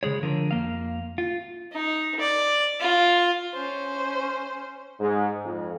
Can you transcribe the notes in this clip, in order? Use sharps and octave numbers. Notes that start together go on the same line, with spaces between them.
C#3 G#3 G#4 C#5
D3 F3 A#4
F2 A#3 F5
F4
D#4
D5
F4
C#4 C5
G#2
F2